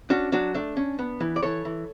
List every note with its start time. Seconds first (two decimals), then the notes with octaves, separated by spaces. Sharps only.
0.10 C#4 D4 F#4
0.32 F#3 D4 F#4
0.54 A3 D4
0.77 C#4
0.99 B3
1.20 E3
1.36 D5
1.42 E3 A4 C#5
1.65 E3